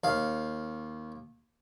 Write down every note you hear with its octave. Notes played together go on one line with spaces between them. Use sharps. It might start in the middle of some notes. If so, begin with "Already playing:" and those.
D#2 F5